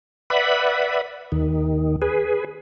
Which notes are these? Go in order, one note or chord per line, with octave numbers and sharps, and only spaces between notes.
B4 D5 E5 F#5 B5
D#2 D#3
G#4 B4